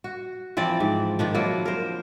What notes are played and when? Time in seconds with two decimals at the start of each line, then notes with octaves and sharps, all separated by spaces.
0.04 F#4
0.57 E3 F3 C4 D5
0.80 G#2
1.19 D#3 F3 D4
1.34 F3 F#3 A#3 E4
1.66 A#4 C5